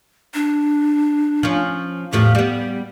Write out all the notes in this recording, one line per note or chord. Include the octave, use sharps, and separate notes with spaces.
D4
F3 C#4
E2 A2 F3 G4
G3 B3